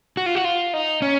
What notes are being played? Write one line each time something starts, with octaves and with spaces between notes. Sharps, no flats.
F#4
F4
F#4
F4
D#4
C#4